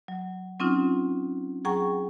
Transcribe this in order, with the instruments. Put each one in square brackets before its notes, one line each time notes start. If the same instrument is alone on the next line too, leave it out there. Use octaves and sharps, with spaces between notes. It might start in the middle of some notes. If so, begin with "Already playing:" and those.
[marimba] F#3
F#3 C4 C#4 D#4 F4
F#3 G#4 F#5 G5 A#5 C#6